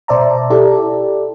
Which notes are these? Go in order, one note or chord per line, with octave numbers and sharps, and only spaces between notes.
B2 C5 D5 E5 A5 A#5
E4 G4 A4 D5